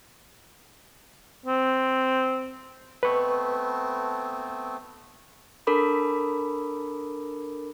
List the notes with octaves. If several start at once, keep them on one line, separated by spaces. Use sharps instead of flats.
C4
A3 B3 C4 B4 C#6
D4 A4 A#4 B5 D6